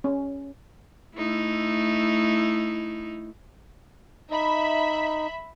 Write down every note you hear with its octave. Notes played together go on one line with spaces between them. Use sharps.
C#4
A3 D#4 E4
D#4 E5 B5